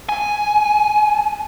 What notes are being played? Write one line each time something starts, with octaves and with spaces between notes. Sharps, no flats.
G#5